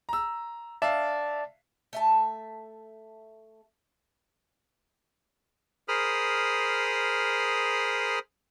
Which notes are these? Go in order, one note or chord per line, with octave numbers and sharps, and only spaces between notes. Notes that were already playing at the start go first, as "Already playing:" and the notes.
A#5 E6
D5 E5 F5 A5
A3 E5 A5
G#4 A#4 C5 B5 D#6 F6